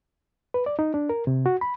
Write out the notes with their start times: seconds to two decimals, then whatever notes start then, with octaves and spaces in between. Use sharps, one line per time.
0.54 B4
0.66 D5
0.79 D#4
0.94 D4
1.09 A#4
1.27 C3
1.46 F#4
1.61 B5